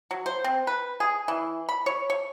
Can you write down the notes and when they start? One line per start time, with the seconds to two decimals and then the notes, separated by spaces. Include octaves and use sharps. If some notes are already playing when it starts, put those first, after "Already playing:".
0.11 F#3
0.26 C5
0.44 C4
0.67 B4
1.00 G#4
1.28 E3
1.69 B5
1.86 C#5
2.10 C#5